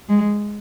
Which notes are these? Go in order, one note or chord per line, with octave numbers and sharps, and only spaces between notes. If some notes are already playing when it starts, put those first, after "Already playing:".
G#3